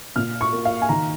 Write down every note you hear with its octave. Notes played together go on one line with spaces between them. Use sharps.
A#2 F6
C#6
A#3
F5
G#5
D#3 A#5